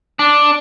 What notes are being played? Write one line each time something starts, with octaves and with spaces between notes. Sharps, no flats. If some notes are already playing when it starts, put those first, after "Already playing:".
D4